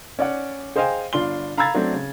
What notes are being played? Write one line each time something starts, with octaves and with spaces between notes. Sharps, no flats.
C#4 D5 F#5
G#4 C5 D#5 F5 G5 G#5
G1 D4 F4 C6 G7
F5 A#5 B5 E6 G#6 A6
F#3 A3 C4 D4
C#3